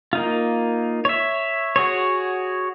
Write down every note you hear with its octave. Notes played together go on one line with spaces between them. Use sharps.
A#3 D#4 F4
C#5 E5
F#4 G#4 C#5